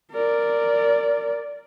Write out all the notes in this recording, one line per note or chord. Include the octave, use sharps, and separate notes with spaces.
A#4 D5